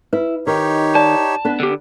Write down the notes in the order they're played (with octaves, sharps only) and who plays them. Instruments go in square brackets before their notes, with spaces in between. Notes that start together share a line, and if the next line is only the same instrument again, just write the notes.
[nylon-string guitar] E4 [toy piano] B4
[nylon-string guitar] D#3 [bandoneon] D#4 G4 C#5
[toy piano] D5 [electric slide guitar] A5
[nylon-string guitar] B3 D4 B4
[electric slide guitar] D3 G4